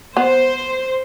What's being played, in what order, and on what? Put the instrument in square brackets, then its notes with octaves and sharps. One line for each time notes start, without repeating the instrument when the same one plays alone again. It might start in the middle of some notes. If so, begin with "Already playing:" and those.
[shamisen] B3 [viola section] C5